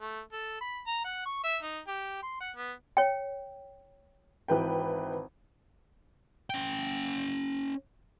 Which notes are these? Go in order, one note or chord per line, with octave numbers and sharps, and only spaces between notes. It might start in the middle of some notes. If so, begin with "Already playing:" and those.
A3
A4
B5
A#5
F#5
C#6
E5
D#4
G4
C6
F#5
B3
C#5 G5
G#1 E3 B4 G5
C#4 G5